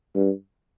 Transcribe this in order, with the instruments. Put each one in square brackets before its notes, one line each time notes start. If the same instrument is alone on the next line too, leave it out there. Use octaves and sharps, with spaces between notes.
[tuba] G2